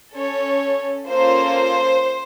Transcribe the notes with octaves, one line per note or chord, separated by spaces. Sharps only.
C#4 A4 C#5
A#3 C#4 F4 A4 C5